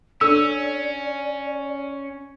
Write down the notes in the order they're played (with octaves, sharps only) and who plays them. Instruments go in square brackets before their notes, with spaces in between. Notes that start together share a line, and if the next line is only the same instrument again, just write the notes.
[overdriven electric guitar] C#4 [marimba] D4 A4 [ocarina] D5 [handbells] E6